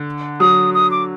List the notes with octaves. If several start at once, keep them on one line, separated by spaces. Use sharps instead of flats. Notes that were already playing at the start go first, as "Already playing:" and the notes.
Already playing: D3
F#3 D#6
D#6
D6